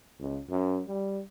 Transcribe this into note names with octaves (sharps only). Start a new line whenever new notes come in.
C#2
F#2
G3